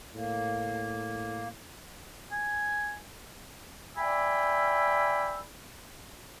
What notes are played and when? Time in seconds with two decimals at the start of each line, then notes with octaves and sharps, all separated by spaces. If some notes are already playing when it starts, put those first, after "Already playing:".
0.15 A2 A#3
2.32 G#5
3.97 D5 E5 G5 G#5 B5 E6